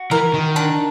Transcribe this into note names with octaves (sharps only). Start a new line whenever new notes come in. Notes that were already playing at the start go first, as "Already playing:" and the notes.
Already playing: F#4
E3 A#4
D#3
D4